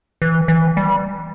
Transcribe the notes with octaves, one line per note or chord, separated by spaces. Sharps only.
E3
E3
G3